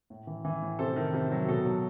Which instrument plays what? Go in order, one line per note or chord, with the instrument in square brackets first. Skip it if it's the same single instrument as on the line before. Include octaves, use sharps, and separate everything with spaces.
[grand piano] A2
E3
E3
A2
C3 A4 C5
D#3
C3
F#3
B2 A4
F#3